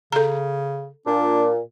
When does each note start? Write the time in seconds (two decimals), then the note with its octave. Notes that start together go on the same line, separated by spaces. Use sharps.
0.12 C#3 A4 A#5
1.07 A#2 D4